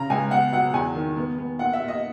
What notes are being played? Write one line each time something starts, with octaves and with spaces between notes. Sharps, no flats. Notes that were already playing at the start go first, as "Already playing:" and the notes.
Already playing: C#3 A#5
C#2 G#5
B3 F#5
F#3 F#5
E2 G#5
D#3
B3
B3
A#2 F#5
E5
A#2
D#5